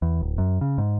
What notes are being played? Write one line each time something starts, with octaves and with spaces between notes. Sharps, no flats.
E2
D1
F#2
C#3
G#2